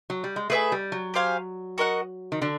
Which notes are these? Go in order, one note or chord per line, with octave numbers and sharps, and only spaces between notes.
F#3
G3
G#3
A3 G#4 B4 E5 G#5
G3
F#3
G4 C5 F5 G#5
F#4 A#4 D#5 F#5
D#3
D3 D4